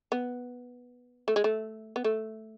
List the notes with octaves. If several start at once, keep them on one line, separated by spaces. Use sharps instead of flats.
B3
A3
G#3
A3
B3
A3